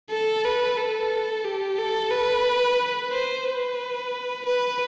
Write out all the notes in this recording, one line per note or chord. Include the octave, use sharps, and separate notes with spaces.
A4
B4
A4
G4
A4
B4
C5
B4
B4